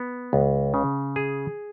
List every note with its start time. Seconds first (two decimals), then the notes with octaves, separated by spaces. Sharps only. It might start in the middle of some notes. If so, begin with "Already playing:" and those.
Already playing: B3
0.33 C#2
0.74 C#3
1.16 G#4